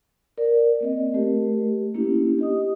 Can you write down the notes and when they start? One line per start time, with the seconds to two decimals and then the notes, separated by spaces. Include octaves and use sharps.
0.38 A#4 D5
0.81 A#3 C4 D#5
1.14 A3 G4 A#4
1.95 A#3 C#4 D4 E4 G4
2.39 G4 D#5 D#6